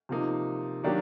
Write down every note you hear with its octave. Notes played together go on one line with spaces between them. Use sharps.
C3 F3 A#3 D#4
D#3 F#3 A#3 D4 G4